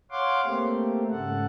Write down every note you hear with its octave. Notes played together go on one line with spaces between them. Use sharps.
C#5 F5 F#5 C6 D6
A3 A#3 C4 G4
G#2 C#3 A4 F#5